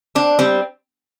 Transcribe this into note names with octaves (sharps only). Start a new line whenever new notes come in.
C4 D4
G3 C4